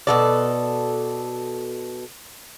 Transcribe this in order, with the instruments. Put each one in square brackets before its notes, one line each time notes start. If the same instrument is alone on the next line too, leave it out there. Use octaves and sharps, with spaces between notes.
[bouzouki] B2 A4 D5